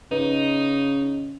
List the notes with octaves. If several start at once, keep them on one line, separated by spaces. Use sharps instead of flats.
C#3 D#4 B4